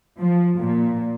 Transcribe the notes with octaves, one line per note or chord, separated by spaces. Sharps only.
F3
A#2